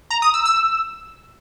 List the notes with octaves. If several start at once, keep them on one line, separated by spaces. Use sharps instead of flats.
A#5
D#6
E6
E6